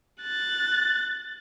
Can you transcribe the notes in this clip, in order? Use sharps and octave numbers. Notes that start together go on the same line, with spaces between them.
F#6 A6